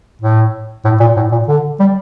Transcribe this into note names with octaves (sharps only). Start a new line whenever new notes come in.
A2
A2
A#2
A2
A#2
D3
G3